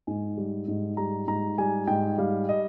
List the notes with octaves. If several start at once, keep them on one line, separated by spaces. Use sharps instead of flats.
G#2 G#5
G3
G#2
G3 A#5
G#2 A#5
G3 G#5
G#2 G5
G3 F5
D#5